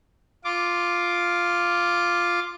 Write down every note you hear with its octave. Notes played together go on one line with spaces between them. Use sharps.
F4 D6